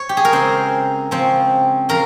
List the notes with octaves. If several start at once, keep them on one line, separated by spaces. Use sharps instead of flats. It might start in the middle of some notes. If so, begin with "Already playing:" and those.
Already playing: C#5
G4
G#4
A#4
C#3 G#3 C4 C5
C#3 F3 C4
C#3 F3 A#4